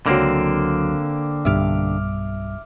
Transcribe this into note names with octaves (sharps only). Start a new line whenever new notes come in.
C#2 D3 F#3 A#3 C4
B1 G2 E5 D6 F6